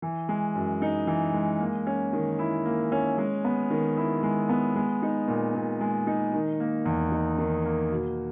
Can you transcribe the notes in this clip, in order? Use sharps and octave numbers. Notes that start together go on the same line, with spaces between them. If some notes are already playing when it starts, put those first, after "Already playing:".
E3
G#3
F#2
D#4
E3
G#3
A#3
C#4
D#3
E4
A#3
C#4
G#3
B3
D#3
E4
G#3
B3
G#3
D#4
A#2
A#2
G#3
D#4
D#3
A#3
E2
D#4
D#3
A#3
B2